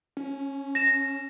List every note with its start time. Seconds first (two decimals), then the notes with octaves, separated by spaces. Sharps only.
0.17 C#4
0.75 A#6 E7